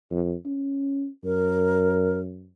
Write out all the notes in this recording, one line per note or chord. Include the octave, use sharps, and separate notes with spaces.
F2
C#4
F#2 A#4